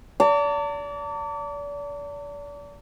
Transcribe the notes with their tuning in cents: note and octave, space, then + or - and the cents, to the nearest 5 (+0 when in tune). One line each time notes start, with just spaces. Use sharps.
D5 -35 A5 +45